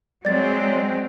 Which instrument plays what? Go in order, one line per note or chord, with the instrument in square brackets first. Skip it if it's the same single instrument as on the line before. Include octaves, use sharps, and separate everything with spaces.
[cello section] F#3 G#3 C4 [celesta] D5 A6